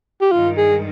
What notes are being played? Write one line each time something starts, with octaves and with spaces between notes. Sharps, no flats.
G4
G2 D#3 G#3 F4
G#4